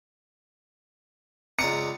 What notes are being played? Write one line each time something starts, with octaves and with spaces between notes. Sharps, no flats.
C#2 D5 A#5 C#7